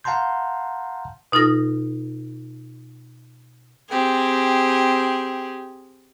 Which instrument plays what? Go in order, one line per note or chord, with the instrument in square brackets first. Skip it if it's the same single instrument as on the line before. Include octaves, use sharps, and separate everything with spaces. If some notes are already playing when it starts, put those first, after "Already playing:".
[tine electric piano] F5 F#5 A5 A#5 C6 G6
[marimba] B2 D#4 F4 A4 A#6
[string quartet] C4 G4 G#4